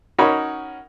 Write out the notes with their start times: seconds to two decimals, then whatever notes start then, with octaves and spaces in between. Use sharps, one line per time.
0.18 C#4 D#4 F#4 A#4 C#5 B5